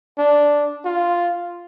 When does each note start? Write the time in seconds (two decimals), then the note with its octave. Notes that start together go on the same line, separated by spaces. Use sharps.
0.18 D4
0.85 F4